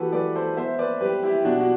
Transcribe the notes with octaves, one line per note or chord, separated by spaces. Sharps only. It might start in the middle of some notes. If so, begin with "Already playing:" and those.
Already playing: E3 F#4 G4 A4 B4
A3 B4 D5
A4 C5
B3 C5 E5
B4 D5
G3 G4 B4
E4 G4
B2 D4 F#4
F#4